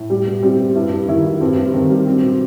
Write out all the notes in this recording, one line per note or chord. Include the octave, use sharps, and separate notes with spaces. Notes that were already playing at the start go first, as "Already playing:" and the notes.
Already playing: A2
G3
B2
G3 C4
B2
G2 E4
G2
D#3 E4
F#3
G2 C4
G2
D#3 C4
G3
F#3 C4
B2